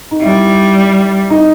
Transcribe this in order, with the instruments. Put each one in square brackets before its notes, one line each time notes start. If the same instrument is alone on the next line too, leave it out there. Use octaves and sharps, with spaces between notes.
[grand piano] D#4
[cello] G3 [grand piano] E4
[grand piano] D#4